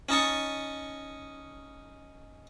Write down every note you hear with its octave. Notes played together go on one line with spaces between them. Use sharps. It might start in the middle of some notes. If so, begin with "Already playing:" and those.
C#4 D#4 A5 C#6